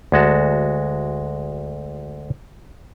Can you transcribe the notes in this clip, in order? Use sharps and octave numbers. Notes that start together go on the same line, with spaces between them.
D2 G#3 F#4 A5